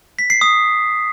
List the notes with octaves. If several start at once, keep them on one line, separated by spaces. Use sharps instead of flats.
B6
C7
D#6